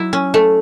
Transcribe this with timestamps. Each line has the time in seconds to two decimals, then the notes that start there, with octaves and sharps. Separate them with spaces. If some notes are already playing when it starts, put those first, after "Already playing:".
Already playing: F#3 E4
0.13 C#4
0.34 A3